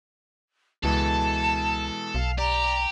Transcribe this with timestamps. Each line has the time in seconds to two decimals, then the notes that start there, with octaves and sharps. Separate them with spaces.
0.84 C#2 B2 E3 G#3 A4 A5
2.15 B1 F5
2.38 G4 D5 A#5